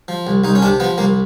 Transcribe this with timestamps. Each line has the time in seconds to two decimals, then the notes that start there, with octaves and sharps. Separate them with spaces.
0.08 F3
0.27 C2
0.44 C2 D#4
0.55 C#4
0.62 C3 D4
0.80 F3 B3
0.98 C2 A#3